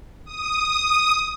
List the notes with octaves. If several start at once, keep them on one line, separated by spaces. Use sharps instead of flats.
D#6